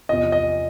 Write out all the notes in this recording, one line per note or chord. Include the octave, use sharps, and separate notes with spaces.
E2 C3 F3 D#5
D#5